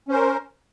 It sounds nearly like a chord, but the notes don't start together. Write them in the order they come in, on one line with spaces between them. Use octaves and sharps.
C#4 C5 A#4